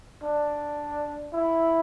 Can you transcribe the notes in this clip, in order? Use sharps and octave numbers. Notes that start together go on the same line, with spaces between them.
D4
E4